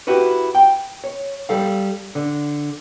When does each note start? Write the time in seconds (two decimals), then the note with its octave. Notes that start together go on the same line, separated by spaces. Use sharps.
0.07 E4 F#4 G4 B4
0.55 G5
1.04 C#5
1.49 G3 A4 F5
2.15 D3